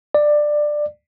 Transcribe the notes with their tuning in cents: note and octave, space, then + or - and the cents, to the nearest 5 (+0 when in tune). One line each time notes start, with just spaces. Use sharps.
D5 +15